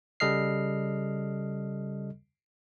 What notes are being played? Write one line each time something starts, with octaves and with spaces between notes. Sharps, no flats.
C#3 G3 A4 D#5 F6 C7